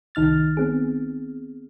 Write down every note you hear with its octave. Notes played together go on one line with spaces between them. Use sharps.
C2 D#3 D#4 F6 A6
B3 C4 G#4